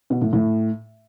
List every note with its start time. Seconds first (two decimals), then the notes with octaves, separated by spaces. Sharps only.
0.10 B2
0.22 A2
0.33 A2